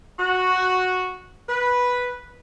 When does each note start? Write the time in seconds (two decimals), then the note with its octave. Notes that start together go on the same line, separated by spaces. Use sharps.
0.19 F#4
1.49 B4